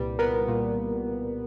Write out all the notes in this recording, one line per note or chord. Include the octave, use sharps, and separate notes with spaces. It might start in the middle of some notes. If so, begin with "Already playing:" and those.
Already playing: C2 A#2 G3 B4
B3 A#4
A#2